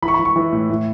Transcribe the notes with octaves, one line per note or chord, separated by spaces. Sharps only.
E3 B5
C#6
B5
E3
C#6
E3
A2
A2